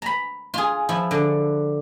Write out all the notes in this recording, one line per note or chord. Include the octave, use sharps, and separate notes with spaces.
A#5 B5
F4 G#4
F3 E4
D3